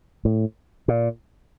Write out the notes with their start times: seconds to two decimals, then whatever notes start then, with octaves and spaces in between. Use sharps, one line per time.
0.25 A2
0.88 A#2